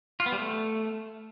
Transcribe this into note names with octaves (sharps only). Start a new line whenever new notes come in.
F4
B3
G3
A3